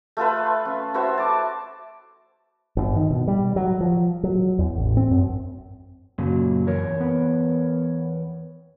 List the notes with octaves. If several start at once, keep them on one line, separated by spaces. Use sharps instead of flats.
A3 F4 A4 B4
C#4
E4 F#4 C5 C#5
A5 D6
G1
D#3
B2
G3
F#3
F3
F#3
E2
A1
C4
F#2
F#2 A#2 C#3 F#3
E2 A#4 C#5
B3